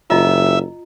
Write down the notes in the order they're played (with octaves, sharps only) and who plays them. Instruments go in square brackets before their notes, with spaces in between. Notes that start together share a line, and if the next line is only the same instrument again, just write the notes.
[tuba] F#1 [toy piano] F4 D#5 A#5 [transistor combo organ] E5